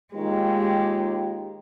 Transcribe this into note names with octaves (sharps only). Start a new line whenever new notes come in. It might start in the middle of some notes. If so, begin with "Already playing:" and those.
D#2 G#3 F4 G4